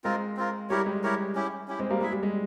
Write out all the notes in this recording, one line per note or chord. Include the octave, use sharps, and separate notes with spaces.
G#3 C4 F4 A#4
C4 F4 A#4
G3 E4 G4 A#4 C#5
G#3
E4 G4 A#4 C#5
C#4 E4 G4
C#4 E4 G4
G#3 C4
G3 A#3
G#3 E4 G#4 E5
G3
G#3